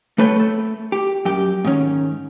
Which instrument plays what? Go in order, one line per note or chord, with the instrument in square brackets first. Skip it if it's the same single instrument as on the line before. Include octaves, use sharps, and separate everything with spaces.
[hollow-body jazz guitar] A3 A4 B4 C#5 E5 G5
A3 A4
G4
F#2 G4
G#2 D#3 C#4